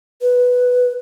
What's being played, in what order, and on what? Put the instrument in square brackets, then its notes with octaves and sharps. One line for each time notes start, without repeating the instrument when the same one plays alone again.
[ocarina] B4